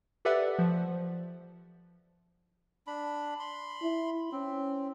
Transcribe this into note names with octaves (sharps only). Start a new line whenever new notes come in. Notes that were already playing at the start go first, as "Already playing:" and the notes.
G4 A4 B4 D5 E5 F#5
F3
D4 B5
B5 C6
E4
C4 C#4